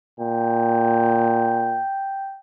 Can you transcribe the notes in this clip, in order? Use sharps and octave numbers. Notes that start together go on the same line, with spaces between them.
A#2 G5